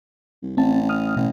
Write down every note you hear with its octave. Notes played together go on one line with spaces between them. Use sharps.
C2
A1 C4 A5
D#6 F6
A1 B2